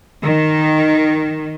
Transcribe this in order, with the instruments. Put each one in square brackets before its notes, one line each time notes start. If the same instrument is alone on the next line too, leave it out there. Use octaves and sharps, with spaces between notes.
[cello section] D#3